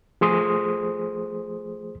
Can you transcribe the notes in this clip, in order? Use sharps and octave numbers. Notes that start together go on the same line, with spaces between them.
F3 A3 G#4 C5 C6 D#6